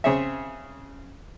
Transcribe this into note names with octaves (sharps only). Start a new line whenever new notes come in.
C#3 C4 G#4 C#5 E5